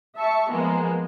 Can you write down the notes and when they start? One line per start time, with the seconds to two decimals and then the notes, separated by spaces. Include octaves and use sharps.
0.17 E5 A5 C#6
0.50 F3 G#3 A#3 B3